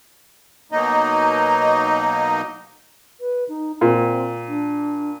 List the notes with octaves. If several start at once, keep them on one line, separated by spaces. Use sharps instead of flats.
B2 F#3 A#3 D#4 D#5
B4
D#4
A#2 C4
D4